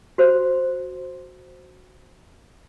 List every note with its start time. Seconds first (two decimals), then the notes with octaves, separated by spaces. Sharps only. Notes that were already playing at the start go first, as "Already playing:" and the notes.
0.18 F#4 C5